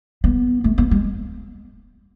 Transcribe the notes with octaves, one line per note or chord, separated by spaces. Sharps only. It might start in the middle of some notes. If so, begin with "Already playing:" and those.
B3
A3
B3
G#3